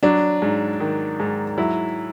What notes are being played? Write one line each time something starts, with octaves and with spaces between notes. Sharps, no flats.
F#3 D4
G#2
D#3
G#2
F#3 E4